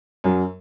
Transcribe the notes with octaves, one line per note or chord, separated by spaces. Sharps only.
F#2 F#3